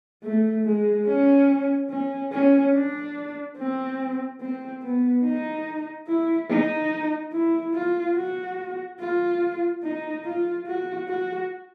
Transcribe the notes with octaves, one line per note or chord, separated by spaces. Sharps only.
A3
G#3
C#4
C#4
C#4
D4
C4
C4
B3
D#4
E4
D#4
E4
F4
F#4
F4
D#4
F4
F#4
F#4